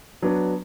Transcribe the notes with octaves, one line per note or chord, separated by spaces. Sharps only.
F#3 B3 D4